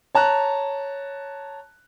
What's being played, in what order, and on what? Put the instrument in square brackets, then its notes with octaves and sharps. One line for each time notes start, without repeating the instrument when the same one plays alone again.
[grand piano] C#5 A5 A#5 F#6